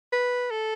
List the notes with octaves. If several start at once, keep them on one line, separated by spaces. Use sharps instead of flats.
B4
A4